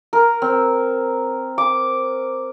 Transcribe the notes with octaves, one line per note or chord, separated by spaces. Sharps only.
A#4
C4
D6